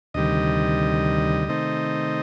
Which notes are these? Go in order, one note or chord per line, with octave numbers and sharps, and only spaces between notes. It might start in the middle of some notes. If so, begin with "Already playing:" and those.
D2 C3 D#3 G3 D#5
C3 D#3 A3 C4 D#4